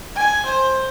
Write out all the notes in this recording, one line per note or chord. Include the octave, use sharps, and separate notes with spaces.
G#5
C5